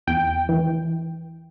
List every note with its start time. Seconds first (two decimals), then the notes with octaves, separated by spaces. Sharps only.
0.07 E2 G5
0.49 E3